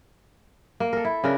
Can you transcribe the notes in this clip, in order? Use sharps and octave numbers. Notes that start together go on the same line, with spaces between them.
A#3
A4 A#4
E4
C#3 D4 A#4